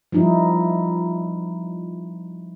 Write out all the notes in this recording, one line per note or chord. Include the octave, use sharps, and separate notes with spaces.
F3 G3 D#4 E4